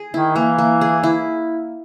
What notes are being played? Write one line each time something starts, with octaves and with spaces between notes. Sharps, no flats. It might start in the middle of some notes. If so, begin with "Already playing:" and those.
Already playing: G#4
D#3 E4
E3 A#3
A#3
G#4
E4